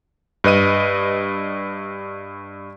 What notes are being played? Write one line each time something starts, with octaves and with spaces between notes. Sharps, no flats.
G2 B4 D#5 D#7